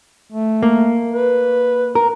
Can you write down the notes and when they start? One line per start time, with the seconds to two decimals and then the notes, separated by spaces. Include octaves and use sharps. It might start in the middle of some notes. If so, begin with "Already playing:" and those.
0.32 A3
0.63 A#3
1.14 B4
1.95 A#4